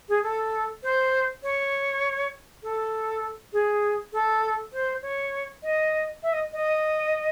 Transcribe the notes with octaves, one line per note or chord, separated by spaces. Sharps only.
G#4
A4
C5
C#5
A4
G#4
A4
C5
C#5
D#5
E5
D#5
D#5